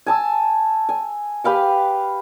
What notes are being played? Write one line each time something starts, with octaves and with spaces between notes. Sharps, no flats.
G#5 A5 E6
G#5
G4 B4 F5 G5